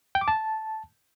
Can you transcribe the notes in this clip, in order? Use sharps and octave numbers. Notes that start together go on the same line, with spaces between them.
G5
D6
A5